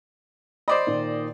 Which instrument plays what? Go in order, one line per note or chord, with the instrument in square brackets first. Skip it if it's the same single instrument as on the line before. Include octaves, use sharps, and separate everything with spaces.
[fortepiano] C5 D5 D#5 [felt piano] B5 D6
[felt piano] A#2 D#3